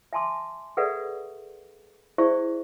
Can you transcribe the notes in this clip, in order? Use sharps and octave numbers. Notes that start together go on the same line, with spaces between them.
E5 G#5 A5 C6 D6
G#4 A4 B4 D5 E5 F#5
E4 G#4 C5 D5 E5 C#6